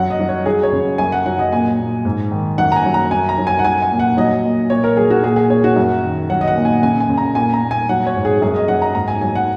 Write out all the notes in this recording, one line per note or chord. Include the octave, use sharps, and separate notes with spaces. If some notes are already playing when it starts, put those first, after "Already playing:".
Already playing: F#2 F#3 F#5
D#5
F#3
C#5
F#3 G#4
C#5
C#3
F#2 G#5
F#5
F#3 F#5
D#5
A#2 G#5
A#2
G#2
D#3
F#2 F#5
A#5
G#5
F#3
A#5
F#2 G#5
A#5
F#3
G#5
F#5
F#3 G#5
G#5
A#2
F#5
F#3 D#5
A#2
A#2 C#5
A#4
F#3 G#4
F#4
A#2 G#4
G#4
A#2 C#5
F#4
F#2
D#3
F#3 F#5
D#5
F#5
A#2
G#5
C#3 G#5
G#5
C#3
A#5
A#2 G#5
A#5
A#2
G#5
F#3 F#5
C#5
G#2
G#4
F#2 G#4
D#5
F#3 F#5
A#5
G#2 A#5
G#5
F#3 G#5
F#5